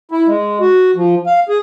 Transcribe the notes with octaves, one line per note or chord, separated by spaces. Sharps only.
E4
G#3
F#4
F3
F5
G#4